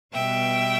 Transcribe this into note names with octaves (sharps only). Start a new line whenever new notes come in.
B2 G3 B3 E5 G5